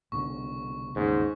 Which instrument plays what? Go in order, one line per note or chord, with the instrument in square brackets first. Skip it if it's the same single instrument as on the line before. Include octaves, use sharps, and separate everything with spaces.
[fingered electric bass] C2 B2 D3 [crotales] C#6
[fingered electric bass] G1 D#2 C#3 [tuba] G#2